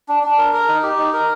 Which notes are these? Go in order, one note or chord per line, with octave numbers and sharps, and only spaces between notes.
D4
D4
A#4
A#4
D#4
G4
D#4
A#4